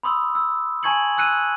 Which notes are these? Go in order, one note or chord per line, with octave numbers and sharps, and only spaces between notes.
B5 C6 D#6 E6
E6
G#5 A5 C#6 G#6 C#7 F#7
E6 F#6 C#7 D#7